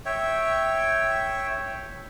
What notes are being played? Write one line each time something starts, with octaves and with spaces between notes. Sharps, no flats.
C#5 E5 G5